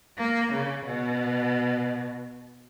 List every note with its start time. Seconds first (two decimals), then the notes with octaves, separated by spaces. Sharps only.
0.18 A#3
0.52 C#3
0.85 B2